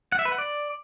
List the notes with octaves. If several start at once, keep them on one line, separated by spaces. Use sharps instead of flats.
F#5
E5
B4
F#5
D5